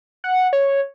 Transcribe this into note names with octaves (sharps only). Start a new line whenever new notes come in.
F#5
C#5